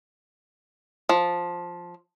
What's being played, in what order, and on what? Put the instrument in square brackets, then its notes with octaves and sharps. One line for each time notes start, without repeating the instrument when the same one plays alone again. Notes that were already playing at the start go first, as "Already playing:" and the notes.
[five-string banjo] F3